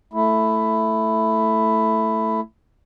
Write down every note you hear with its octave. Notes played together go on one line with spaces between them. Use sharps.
A3 E4